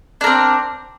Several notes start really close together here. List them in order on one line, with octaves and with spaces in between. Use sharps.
D4 A#4 C4